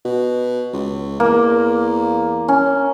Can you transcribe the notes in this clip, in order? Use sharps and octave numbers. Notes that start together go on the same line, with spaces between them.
B2
C#2
E2 A#3
C#4